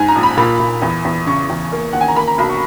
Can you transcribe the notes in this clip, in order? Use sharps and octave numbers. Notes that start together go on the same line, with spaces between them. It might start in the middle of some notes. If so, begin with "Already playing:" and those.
Already playing: G#2 G#5
A#5
A#1
B5
A#2 B5
A#2
E2
E2
C#3 C#6
E2
A#3
D#2 F#5
G#5
A#5
A#3 B5
A#5
B1 B5
C#6